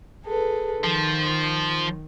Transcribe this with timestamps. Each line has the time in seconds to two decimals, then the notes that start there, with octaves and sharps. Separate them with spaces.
0.24 G#4 A4 B4
0.84 D#3 F3